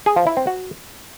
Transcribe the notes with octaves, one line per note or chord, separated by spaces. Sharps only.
G#4
F3
E4
C4
F#4